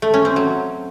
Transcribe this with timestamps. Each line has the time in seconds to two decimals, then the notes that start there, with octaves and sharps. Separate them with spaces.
0.02 A3
0.14 C#4
0.25 C4
0.36 F#3